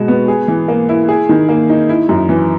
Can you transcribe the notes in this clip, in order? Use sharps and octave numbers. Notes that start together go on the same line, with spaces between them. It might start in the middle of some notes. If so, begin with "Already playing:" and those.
Already playing: B2 G#3 F#4
B3
G#4
E3
A#3
E4
G#4
D#3
A#3
D#4
E4
F#2
E3